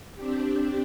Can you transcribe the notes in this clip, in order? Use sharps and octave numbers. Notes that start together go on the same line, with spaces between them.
C4 D4 G4